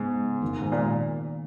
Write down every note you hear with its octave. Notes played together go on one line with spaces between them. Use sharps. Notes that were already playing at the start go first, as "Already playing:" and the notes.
Already playing: G#2 C#3 G#3 B3
D#3 A#3 D#4
G#2
A#2